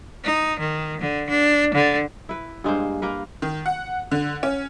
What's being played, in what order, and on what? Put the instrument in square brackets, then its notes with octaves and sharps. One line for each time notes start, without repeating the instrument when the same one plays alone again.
[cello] D#4
D#3
D3
D4
D3
[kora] E4 B4
G2 G#3 A#3 C5
A#3 A#4 B4
[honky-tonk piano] D#3
F#5
D3
C#4